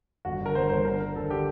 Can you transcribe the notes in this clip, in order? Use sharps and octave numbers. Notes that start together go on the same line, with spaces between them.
G1 F#4
D3
A#4
G1 C5
G1 C5
D3 A#4
D3 A#4
D2 A4
D3 G4